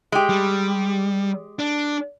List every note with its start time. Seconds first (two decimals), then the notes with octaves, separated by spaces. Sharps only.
0.12 G#3 G4
0.30 G3
1.59 D4